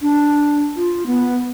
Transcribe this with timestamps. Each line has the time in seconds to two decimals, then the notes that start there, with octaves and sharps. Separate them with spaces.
0.02 D4
0.77 F4
1.07 B3